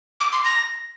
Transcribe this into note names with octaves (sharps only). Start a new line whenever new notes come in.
D6
C6
A#6